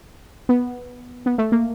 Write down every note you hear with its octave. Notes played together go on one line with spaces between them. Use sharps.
B3
B3
A3
A#3